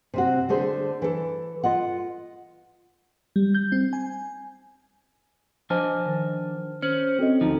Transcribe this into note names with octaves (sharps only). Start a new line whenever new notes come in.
C3 C4 F#4
D3 A3 G#4 C5
E3 A4
F4 D#5 F#5
G3
G6
C4
G#5
F3 D4 C5 D#5 G#5 A5 F6
D#3
C#4 C5 F6 F#7
C4 F#4 A4 D#5
D2 F3 D#4